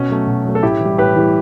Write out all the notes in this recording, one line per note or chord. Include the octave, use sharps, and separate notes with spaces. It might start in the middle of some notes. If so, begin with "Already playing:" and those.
Already playing: B2 C#4
F#3 A3
B2
F#3 A3
A4
A2 E4 G4
E3
G3
A2 G4 B4
E3 G3